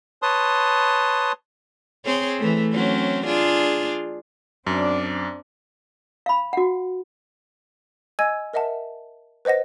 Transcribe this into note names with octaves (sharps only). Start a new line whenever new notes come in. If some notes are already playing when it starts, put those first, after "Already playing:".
B4 C#5 A5 C6 D#6
C4 G#4 C#5
E3 A3
F#3 C4 C#4
D4 F4 G#4
F#2 C4 D4 D5
F5 B5
F#4 F#5
D#5 G#5 E6 G#6 D#7
A#4 D#5 E5 F#5 A5
B4 C5 D#5 F#5 A#6